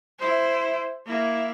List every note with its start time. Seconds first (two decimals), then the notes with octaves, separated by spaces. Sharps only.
0.20 E4 C5
1.07 A#3 E4